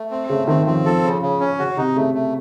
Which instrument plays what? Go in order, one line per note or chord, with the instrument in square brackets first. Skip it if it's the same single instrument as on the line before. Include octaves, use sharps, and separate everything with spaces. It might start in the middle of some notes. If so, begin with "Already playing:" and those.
Already playing: [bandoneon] A3
C4
[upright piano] C#3 [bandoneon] A3
[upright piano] D#3 [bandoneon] C4
[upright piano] F3 [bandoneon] C4
[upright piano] F3 [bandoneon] A4
[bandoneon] C#3
C#3
C#4
[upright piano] C#3 [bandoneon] F#4
[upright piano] C3 [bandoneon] D#4
[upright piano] C#3 [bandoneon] A3
[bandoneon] A3